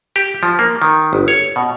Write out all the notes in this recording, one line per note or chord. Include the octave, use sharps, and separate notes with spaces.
G4
F3
A#3
D#3
G1
C#5
B2